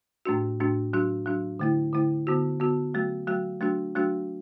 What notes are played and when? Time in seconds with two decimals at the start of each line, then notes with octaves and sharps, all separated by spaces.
0.25 A2 A3 D4 F#4
0.60 A2 A3 D4 F#4
0.93 F#3 D4 F#4
1.26 F#3 D4 F#4
1.60 D3 A3 E4
1.93 D3 A3 E4
2.27 D3 B3 F#4
2.60 D3 B3 F#4
2.94 F#3 A3 F#4
3.27 F#3 A3 F#4
3.61 F#3 A3 D4 F#4
3.95 F#3 A3 D4 F#4